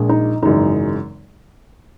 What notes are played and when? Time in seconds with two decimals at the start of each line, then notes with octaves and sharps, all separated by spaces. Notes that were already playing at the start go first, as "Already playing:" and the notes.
Already playing: A#1 A#2 G#3
0.09 D#4
0.43 G#1 F#2 C#3 E3 G#3 D#4